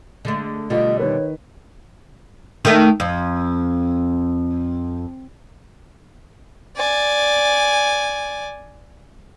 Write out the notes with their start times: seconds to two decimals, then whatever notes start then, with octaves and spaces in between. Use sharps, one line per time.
0.25 D3 G#3 A3
0.70 B2 D3 G3 A3 F4 D#5
0.99 D#3 B4 C#5
2.65 D#3 A3
3.00 F2
6.76 D5 G#5